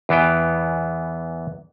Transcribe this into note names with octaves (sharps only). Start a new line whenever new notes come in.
E2 E3 B3 G5